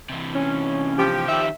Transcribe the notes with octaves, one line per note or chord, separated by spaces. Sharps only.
C3 E3
C#4
F3 G4
D#3 G3 E5